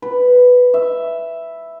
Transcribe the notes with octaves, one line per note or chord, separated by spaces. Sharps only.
B4
E5